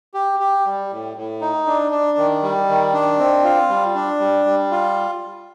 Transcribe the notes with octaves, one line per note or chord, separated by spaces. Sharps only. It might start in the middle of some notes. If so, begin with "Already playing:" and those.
G4
G4
G3
A2
A2
D#4
D4
D4
D#3
G3
D#3
D4
C4
F4
G3
D4
G3
G3
F4